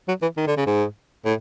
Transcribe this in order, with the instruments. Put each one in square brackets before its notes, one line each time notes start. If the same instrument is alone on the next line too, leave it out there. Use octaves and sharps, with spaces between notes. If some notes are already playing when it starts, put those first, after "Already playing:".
[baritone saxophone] F#3
E3
D#3
D3
C#3
G#2
A2